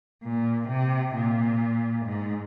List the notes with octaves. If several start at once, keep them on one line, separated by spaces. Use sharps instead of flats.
A#2
C3
A#2
G#2